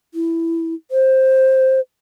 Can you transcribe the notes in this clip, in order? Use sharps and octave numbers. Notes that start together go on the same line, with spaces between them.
E4
C5